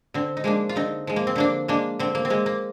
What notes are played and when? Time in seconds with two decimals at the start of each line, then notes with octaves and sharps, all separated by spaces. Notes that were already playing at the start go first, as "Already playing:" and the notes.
0.14 D3 C4
0.37 D#4
0.44 F3 G#3 A#3 D4
0.69 F4
0.76 D3 C4 D#4
1.07 F3 G#3
1.16 A#3
1.27 C4
1.36 D3 A#3 D4
1.68 G#3 A#3 D4
1.99 D3 C4
2.15 A#3
2.25 C4
2.30 G#3 A#3
2.46 A#3